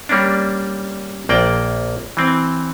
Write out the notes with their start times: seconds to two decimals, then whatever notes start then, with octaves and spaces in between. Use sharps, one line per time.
0.09 G3 A#3 C#4 D4
1.29 A#1 A#3 D5 G5
2.17 E3 C4